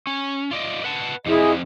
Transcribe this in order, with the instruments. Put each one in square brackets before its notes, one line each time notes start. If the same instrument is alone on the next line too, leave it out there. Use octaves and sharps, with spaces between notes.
[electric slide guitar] C#4
F4 D5 D#5
B4 F#5 A5
[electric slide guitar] F2 C3 F3 [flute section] E4 G#4 D#5